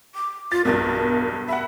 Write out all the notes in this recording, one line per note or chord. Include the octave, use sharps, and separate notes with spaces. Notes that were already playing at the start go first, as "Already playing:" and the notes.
D6
F4 A6
B1 E2 G2 A#4
E5 F#5 B5